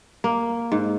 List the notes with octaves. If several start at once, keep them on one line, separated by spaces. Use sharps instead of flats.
A#3
G#2